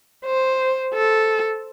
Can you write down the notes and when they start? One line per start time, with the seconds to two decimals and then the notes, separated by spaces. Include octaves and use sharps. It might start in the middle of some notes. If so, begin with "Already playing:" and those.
0.26 C5
0.94 A4